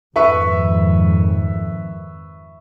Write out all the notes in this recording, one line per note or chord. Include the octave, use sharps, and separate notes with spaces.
F2 G#2 D#3 B4 E5 C#6